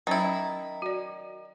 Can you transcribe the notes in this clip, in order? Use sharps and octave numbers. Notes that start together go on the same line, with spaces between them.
D#3 F#3 C#4 E4
F#4 D5